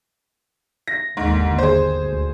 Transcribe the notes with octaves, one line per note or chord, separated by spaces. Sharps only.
A#6
G1 D#2 G#2 D3
G#4 C5
D2